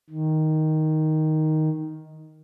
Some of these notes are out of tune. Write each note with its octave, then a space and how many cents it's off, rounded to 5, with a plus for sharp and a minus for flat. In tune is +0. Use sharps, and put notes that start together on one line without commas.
D#3 +5